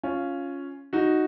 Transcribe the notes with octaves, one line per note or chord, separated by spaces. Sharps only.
C#4 F4
D#4 F#4